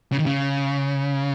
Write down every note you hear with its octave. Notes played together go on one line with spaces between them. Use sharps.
C#3
D#3
C#3